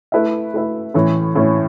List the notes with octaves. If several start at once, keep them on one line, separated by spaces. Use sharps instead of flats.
A3 E4 B4 E5
A3 E4 B4 E5
A2 E3 C#4 E4
A2 E3 C#4 E4